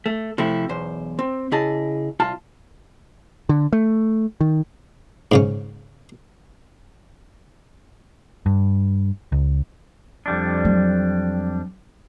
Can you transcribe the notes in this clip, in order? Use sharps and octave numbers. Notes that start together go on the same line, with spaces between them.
A3
C3 F3 A3 C4 E4
B1 E2 C5
C4
C#3 E4 G#4 D#5 A5
C2 F4 A5
D3
A3
D#3
G#2 C#3 C#4
G2
C#2
F2 G3 D4
F#3